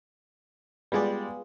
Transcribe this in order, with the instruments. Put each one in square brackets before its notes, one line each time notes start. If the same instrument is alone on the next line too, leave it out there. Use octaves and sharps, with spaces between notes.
[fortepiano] G3 G#3 D5 [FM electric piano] B3 F4 G#4